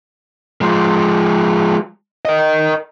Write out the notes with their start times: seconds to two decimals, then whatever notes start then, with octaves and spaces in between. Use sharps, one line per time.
0.61 F3 G#3
2.25 A#4 D#5